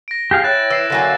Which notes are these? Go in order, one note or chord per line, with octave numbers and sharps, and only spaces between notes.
A#6 D7
G4 G#4 F5
E4 C#5 G5 F#6 A6
E3 E6 C7 E7
D3 F#3 A#3 E5 G#5